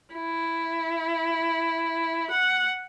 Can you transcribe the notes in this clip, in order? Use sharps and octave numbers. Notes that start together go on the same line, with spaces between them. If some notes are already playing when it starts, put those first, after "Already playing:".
E4
F#5